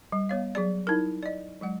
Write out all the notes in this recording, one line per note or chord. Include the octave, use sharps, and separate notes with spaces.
G3
B3 C#5 F5
F#3 G#4 D5
D#4 E4 A#4
D5 D#5
F#3 G#3 F#5